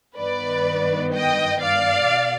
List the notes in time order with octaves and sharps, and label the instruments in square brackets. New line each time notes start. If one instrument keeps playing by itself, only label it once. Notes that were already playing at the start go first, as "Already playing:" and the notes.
[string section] G2 D#3 B3 B4 D5
D#5 G5
D5 F5
B2